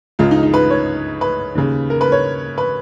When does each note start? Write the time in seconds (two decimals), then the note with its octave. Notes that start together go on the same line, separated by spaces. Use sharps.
0.19 C#2 C#3 F4
0.31 D#4
0.43 D#4
0.54 B4
0.70 C#5
1.21 B4
1.55 D#2 C#3
1.90 A#4
2.01 B4
2.12 C#5
2.58 B4